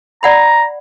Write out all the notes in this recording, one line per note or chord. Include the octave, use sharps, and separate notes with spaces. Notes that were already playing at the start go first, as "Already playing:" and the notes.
D5 F#5 A#5 B5